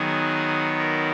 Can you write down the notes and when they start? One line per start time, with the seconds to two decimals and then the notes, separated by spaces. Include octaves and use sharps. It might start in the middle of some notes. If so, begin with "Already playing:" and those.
Already playing: D#3 F#3 B3 G#4
0.79 A#4